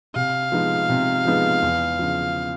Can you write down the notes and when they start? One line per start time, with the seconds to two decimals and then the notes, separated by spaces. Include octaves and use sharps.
0.15 C3 F5
0.52 F3 G#3 B3 D#4
0.89 C3
1.25 F3 G#3 B3 D#4
1.62 E2
1.99 C#3 F3